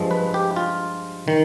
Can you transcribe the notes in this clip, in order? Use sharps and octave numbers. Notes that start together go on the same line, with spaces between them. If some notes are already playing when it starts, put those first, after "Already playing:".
Already playing: G2 F3 G#3
B4
G4
F4
D#3